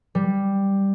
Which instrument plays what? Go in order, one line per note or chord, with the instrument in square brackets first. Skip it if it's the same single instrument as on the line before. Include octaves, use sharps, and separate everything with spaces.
[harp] G3